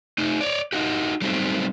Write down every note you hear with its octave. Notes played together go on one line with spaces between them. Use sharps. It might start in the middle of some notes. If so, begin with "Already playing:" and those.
A3 D#4
C#5 D5
D#4 F#4 G4
F#3 G3 A3 C4 D#4